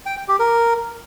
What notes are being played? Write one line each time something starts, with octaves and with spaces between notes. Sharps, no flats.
G5
G5
G4
A#4